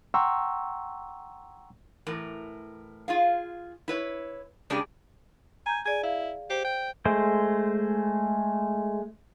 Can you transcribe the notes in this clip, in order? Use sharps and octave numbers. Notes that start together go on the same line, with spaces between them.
F#5 G5 A#5 C6 C#6 E6
A2 E3 A#4
F4 G#4 F5
E4 B4 C#5
C#3 G#3 C#4 D4 G4 G#4
G#5 A#5 G6
G#4 D5 G#5
E4 F5
G4 C5
G5
G#3 A3 C5